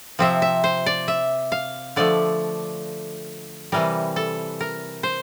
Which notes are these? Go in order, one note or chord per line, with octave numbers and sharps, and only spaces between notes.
C3 F3 C4 E5
E5
C5
D5
E5
F5
D3 F3 A3 D5
C3 E3 G3 A#4
A4
A#4
C5